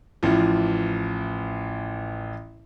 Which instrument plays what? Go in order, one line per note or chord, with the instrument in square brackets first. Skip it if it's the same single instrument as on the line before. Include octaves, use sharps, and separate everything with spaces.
[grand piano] A1 E3 F3